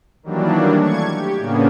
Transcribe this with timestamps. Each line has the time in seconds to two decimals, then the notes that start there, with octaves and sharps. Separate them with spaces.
0.23 D#3 E3 F#3 G3 A#3 D4
0.80 A3 C#6 G#6
1.10 G4
1.39 A2 C#3 A#3 B3 C#4 D4